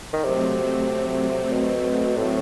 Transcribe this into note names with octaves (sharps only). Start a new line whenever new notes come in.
D#3
C3 F#3 A3 C4
B2
A2